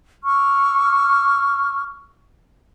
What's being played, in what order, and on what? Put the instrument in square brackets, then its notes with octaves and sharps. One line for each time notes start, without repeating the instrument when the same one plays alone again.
[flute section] C#6 D6 E6 F6